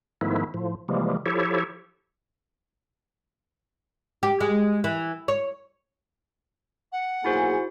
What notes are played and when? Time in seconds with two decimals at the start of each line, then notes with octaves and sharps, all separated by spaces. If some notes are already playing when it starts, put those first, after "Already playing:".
0.21 G#2 D#3 F3 A3 B3 E4
0.54 A2 F3
0.88 C3 E3 F3 G3 G#3 A#3
1.26 F3 E4 G4 A4 C#5
4.23 G4
4.41 G#3
4.84 E3
5.28 C#5
6.92 F#5
7.25 B1 A#3 E4 F#4 G#4 C5